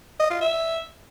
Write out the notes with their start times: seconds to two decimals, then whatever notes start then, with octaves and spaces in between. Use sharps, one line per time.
0.19 D#5
0.30 F4
0.41 E5